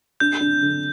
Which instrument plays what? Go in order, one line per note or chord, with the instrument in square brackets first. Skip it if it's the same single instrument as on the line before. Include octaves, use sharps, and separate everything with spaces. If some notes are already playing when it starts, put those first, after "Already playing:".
[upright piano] D4 [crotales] G6
[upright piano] D4
D3